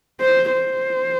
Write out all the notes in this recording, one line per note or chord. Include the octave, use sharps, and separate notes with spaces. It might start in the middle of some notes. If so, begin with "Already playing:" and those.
C5
C5